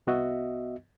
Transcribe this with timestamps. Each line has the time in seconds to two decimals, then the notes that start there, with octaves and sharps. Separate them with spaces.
0.07 C2 B3 F#4 D#5 E5